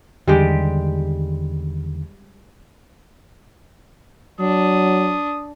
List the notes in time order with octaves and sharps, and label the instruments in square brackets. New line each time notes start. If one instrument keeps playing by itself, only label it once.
[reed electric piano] E2 D3 D#3 [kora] G3 G#3 G4
[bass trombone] F#3 [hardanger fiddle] D4 [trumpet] D#6